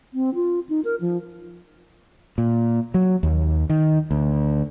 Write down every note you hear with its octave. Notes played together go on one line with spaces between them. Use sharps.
C4
F4
D#4
A#4
F3
A#2
F#3
D#2
D#3
D2